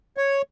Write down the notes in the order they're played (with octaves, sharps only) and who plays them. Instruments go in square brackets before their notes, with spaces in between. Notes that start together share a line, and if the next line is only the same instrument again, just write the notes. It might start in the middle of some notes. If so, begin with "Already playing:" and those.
[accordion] C#5